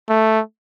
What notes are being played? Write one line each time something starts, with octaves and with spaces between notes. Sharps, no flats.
A3